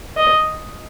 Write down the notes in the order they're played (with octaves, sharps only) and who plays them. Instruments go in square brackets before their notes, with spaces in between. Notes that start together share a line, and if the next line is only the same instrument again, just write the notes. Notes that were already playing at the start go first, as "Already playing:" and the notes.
[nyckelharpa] D#5